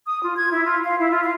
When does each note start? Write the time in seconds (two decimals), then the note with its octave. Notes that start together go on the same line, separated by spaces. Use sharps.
0.06 D#6
0.23 F4
0.37 G#6
0.52 E4
0.65 F4
0.84 F5
0.99 E4
1.11 F4
1.23 F5